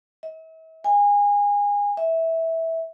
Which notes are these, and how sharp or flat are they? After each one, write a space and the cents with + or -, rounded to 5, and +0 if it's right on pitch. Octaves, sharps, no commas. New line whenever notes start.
E5 -40
G#5 -25
E5 -15